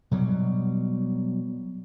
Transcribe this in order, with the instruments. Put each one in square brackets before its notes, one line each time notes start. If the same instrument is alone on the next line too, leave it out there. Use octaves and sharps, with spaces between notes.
[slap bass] B2 F#3 G3